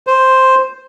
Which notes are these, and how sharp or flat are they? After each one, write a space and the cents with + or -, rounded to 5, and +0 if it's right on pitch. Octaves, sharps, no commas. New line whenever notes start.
C5 +0